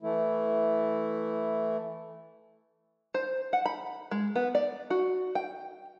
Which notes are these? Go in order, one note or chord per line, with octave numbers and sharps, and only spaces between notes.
E3 A3 E4
C5
F#5
B5
G#3
B3
D5
F#4
G5